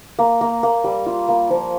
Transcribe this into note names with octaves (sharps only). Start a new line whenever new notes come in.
A#3
A#3
A#3
G3
F4
A#3
F3